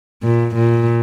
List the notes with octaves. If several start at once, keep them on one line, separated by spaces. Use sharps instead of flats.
A#2
A#2